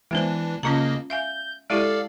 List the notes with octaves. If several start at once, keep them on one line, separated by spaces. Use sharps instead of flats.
E3 G#3 B3 D4 C5
C#3 A#3 C#4 F4 D#5 A#5
E5 F5 G#5 G6
G#3 E4 G4 A4 D5 F5